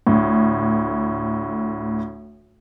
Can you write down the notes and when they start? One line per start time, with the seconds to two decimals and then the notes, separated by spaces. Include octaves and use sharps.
0.07 D2 A2